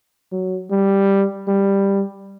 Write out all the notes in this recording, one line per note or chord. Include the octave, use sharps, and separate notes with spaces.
F#3
G3
G3